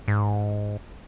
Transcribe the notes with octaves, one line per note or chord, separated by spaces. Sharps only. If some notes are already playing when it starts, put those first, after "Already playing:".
G#2